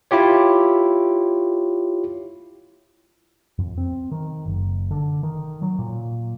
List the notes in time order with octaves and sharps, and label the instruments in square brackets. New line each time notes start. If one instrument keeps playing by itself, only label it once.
[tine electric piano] E4 F4 G4 C#5
[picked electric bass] F2
C4
D#3
F#1
D3
D#3
F#3
A#2